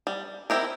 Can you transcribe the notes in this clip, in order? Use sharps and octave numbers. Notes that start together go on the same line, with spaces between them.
G3
C4 E4 G4 A#4